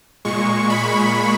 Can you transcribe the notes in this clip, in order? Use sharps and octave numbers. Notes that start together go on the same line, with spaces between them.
A#2 G#3 C#6
B5